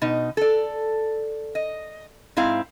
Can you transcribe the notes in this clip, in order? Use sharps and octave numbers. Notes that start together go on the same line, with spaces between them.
B2 D#4
A4 D5
D#5
G#2 C4 E4 F5